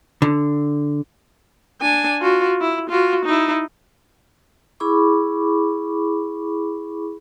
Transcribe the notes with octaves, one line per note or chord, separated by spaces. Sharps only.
D3
D4 G#5
F4 F#4
E4
F4 F#4
D#4 E4
E4 G#4 B5 C#6 D6